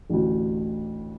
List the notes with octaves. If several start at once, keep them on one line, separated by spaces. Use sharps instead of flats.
A1 D2